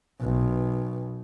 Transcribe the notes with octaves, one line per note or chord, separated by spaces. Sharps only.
B1